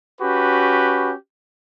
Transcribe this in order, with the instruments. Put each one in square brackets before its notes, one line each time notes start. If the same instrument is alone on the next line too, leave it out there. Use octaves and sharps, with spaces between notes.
[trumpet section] C#4 F#4 G4 B4